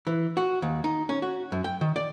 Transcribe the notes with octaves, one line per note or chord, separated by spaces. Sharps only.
E3
F#4
D#2
D#4
C#4
F#4
F#2
G5
D#3
D5